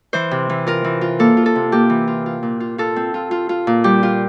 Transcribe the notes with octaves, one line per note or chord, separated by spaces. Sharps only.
E3 C5
C3
E3
F4 A#4
E3
F4
A#3 A4
F4
A4
C3
A#3 G4
E3
F4
F4
A#2
F4
F4 A4
C4
F4
F4
F4
A#2
G3 G4
F4